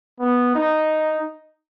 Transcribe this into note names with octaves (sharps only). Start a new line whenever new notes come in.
B3
D#4